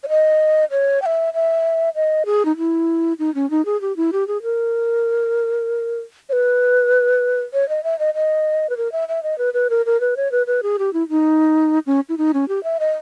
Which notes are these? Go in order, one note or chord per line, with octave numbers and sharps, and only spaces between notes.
C#5
D#5
C#5
G5
E5
E5
D#5
G#4
D#4
E4
D#4
C#4
D#4
G#4
G4
E4
G4
G#4
A#4
C#5
B4
C#5
D#5
E5
D#5
D#5
B4
A#4
E5
E5
D#5
B4
B4
A#4
A#4
B4
C#5
B4
B4
G#4
G4
E4
D#4
C#4
E4
D#4
C#4
G4
E5
D#5